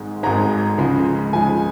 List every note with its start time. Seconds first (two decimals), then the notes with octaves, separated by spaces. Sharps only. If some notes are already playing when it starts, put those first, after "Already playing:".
Already playing: G#1 G#2 G#3
0.23 G#1 G#2 G#3 A#5
0.78 C#2 C#3 F3 G#3
1.33 C#2 C#3 F3 G#3 G#5